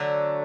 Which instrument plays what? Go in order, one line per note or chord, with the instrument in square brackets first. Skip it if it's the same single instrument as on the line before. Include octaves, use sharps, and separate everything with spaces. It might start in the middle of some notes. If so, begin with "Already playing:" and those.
Already playing: [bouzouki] D3 F#3 A3